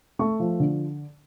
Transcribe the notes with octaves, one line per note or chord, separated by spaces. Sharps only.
A3 C#6
F3
D3